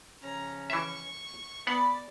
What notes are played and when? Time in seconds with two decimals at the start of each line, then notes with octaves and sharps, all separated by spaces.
0.22 C#3 F3 C#4 A#5
0.70 E3 E5 C#6
1.67 B3 D5 F#5 B5